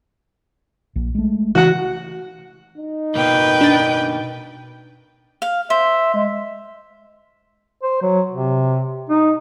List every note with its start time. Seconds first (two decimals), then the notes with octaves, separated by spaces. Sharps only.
0.96 A#1
1.15 G#3 A3
1.55 C#3 E3 F#4 F#5
2.78 D#4
3.15 B2 A#3 B4 G5
3.61 D4 A6
5.42 F5
5.70 C5 E5
6.14 G#3
7.83 C5
8.02 F#3
8.32 C3
9.09 D#4